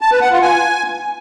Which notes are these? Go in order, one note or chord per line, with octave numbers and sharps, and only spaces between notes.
A5
B4
F#5
F4
G#5